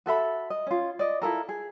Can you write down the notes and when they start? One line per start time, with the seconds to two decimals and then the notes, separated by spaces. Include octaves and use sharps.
0.06 F#4 A4 E5 B5
0.50 D#5
0.67 C#4 F4
0.99 D5 D#5
1.22 E4 F4 A4 A#4
1.49 G#4